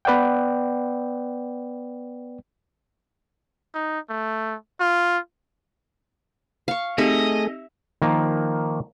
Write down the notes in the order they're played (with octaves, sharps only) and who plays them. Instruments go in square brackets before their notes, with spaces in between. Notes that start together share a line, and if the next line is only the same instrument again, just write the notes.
[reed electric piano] B3 B4 D5 F#5 G5
[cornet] D#4
A3
F4
[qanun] F5 C#6
[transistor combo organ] A3 G#4 [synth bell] C4 D#4 G4 [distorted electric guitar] D#5 [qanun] E5
[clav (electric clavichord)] D#3 F3 A#3